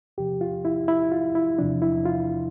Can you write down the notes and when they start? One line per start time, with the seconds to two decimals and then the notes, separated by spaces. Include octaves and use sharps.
0.18 E2 C3 F3 G4
0.41 F4
0.65 E4
0.88 E4
1.12 F4
1.35 E4
1.58 E2 C3 F3 D4
1.82 E4
2.05 F4